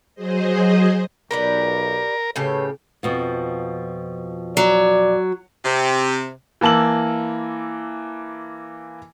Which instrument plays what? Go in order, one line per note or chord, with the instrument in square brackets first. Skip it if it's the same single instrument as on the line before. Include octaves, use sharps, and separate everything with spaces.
[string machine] F#3 G#4 C5 D#5
[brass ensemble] B1 [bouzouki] G4 B4 D5 [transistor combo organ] A#4
[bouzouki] A2 C#3 G4 [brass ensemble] A4 B4 C#5
[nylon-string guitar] F2 B2 F3
[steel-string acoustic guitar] F#3 [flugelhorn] D5
[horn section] C3
[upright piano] E3 A#3 A5 E6 F#7